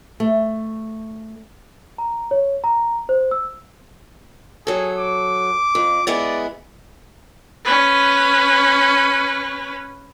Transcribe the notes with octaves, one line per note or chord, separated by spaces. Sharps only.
A3
A#5
C#5
A#5
C5
E6
F#3 G#4 A4
D6
F2
G#3 B3 E4 D5
C#4 B4